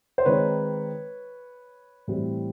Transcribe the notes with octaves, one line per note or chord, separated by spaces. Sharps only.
C5
D#3 G#3 C4 D#4 B4 C#5
A2 E3 G3 C4 E4